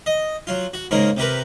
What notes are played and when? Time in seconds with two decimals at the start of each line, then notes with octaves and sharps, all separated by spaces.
0.06 D#5
0.47 F#3 F4
0.74 F#4
0.91 G#2 C#3 A#3 A#4
1.17 C3 G4 A#4 B4